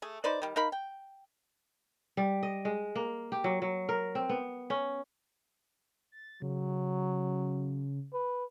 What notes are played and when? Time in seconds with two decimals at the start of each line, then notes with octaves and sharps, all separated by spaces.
0.02 A3 G#4
0.24 D#4 B4 C5 D5
0.42 D#3 G3
0.56 D#4 A#4 F5 B5
0.72 G5
2.17 G3
2.43 D#5
2.65 G#3
2.96 A#3
3.32 G4
3.44 F#3
3.62 F#3
3.89 A#4
4.15 C4
4.29 B3
4.70 C#4
6.12 A6
6.42 C#3 F#3
8.13 B4